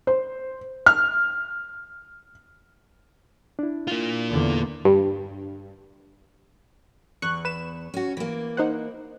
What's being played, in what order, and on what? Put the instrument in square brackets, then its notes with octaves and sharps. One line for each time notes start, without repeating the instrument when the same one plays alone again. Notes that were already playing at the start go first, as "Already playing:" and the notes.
[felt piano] C5
F6
[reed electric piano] D4 E4
[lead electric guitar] A#3 F4
[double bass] E2 D3
[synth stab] G2
[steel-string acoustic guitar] E2 [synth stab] C#6 F#6
[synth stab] B4 E7
[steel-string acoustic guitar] C#4 F#4
E3 A#3
[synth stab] D#4 C5 F#5